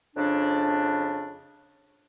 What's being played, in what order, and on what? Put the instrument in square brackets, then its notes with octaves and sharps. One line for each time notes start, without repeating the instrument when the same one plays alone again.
[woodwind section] F2 C#3 D4